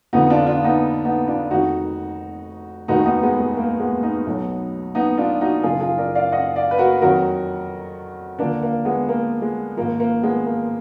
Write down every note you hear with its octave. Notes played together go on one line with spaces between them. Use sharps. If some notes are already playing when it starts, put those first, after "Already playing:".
F2 D3 F3 B3 D#4
D4 F4
D4 F4
B3 D#4
B3 D#4
D4 F4
F1 F2 D#3 D#4 F#4
F1 D#2 D#3 D#4 F#4
B3 D#4
G#3 B3
G#3
A#3
G#3 B3
B3 D#4
B1 B2 F#3
B3 D#4
D4 F4
D#4 F#4
F#1 F#2 F3 F4 G#4
F4 G#4
A#4 D5
D5 F5
D#5 F#5
D5 F5
B4
F#4 A#4
F2 D#3 F#3 F#4 A#4
D#2 D3 F3 A#3 D4
A#3
G#3 B3
A#3
G#3
G#1 G#2 F3 A#3
A#3
G#3 B3
A#3